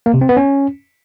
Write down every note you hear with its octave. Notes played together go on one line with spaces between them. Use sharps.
A#3
C3
C4
B3
C#4